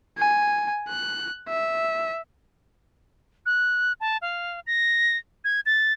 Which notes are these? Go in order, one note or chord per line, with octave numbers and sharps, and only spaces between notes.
G#5
F#6
E5
F#6
A5
F5
A#6
G#6
A6